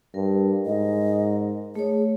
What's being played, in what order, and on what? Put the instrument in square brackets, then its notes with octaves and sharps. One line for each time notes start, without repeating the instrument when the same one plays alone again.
[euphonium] G2 [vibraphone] A#4
[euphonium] G#2 [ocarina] D#5
[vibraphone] A3 C#5 [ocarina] G#4